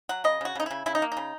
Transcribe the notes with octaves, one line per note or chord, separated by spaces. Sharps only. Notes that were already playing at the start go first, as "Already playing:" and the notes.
F#3 F#5
C#3 D#5
C#3 F#4
C#3 D#4
C#3 E4
C#3 E4
D#4
A#3
D#4
C#3